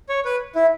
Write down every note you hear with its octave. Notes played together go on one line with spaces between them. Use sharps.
C#5
B4
E4